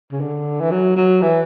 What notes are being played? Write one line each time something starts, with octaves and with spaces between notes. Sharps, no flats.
C#3
D3
E3
F#3
F#3
E3